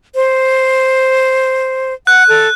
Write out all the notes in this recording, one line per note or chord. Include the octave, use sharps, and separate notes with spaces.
C5
F#5 F#6
A4